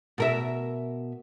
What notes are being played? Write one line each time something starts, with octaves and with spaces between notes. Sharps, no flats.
B2 A#4 E5